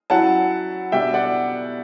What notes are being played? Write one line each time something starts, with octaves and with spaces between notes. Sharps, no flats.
F#3 C#4 E4 F#5 A5
B2 G3 D4 E5 G5
D5 F#5